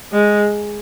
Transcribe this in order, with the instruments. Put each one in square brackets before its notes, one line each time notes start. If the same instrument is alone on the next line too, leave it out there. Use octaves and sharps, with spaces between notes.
[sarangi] G#3